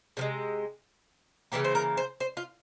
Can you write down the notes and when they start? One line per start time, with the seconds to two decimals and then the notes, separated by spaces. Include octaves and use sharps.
0.17 C3 F3 G#3
1.52 C#3 E3 A#3 G4
1.64 C5
1.75 A#4
1.97 C5
2.20 C5
2.37 F4